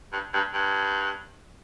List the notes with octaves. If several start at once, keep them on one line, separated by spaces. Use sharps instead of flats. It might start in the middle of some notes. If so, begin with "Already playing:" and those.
G2
G2
G2